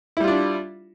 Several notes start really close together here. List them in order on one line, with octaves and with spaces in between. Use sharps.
E4 G3 F4 D4